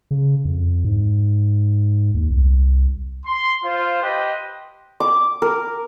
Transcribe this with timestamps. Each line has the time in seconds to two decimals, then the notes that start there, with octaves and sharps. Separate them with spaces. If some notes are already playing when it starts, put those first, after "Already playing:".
0.11 C#3
0.45 F2
0.85 G#2
2.14 D#2
2.30 C2
3.26 C6
3.64 F4 C5
4.02 G4 B4 C5 D#5
5.00 D6
5.42 A#4